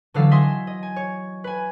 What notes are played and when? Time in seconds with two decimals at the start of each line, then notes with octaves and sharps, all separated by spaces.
0.14 D3 E3 F#3 A4 F5 E6
0.31 D#5 E5 G#5 C6 D#6
0.67 D#5
0.83 G#5
0.96 C#5
1.44 B4 G#5